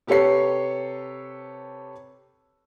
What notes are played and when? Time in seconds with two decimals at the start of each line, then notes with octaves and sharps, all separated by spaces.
0.07 C3 G4 A4 B4 C#5 C7